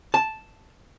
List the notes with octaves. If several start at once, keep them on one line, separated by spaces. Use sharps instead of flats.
A5